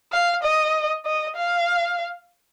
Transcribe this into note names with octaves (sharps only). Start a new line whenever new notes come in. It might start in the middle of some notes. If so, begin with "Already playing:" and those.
F5
D#5
D#5
F5